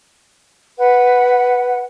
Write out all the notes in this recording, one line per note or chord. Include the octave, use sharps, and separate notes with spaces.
B4 F#5